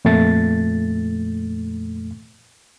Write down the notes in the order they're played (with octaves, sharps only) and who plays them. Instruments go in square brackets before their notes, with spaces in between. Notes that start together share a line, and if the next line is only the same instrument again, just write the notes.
[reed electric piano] F2 A#2 A3 A6